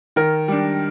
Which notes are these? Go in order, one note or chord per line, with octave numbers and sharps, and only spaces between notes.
D#3 A#4
G3 D4